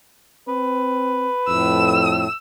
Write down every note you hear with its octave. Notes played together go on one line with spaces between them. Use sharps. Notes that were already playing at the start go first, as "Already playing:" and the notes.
C4 B4
F2 A2 E6